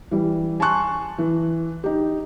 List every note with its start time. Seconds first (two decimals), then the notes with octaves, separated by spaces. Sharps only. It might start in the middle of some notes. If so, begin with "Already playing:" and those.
0.11 E3 G3
0.60 G#5 A5 C6 C#6 F#6
1.18 E3
1.84 D#4 G4